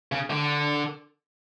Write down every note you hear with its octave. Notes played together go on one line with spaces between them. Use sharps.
C#3
D3